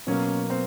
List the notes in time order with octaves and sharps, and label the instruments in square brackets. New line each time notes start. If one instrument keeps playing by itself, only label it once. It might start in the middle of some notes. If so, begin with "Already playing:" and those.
[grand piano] B2 F#3 A#3 [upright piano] C#4
[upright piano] C4